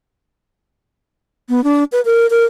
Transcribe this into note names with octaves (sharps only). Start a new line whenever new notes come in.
B3
D4
B4
A#4
A#4